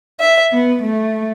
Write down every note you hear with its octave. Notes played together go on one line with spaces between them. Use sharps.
E5
B3
A3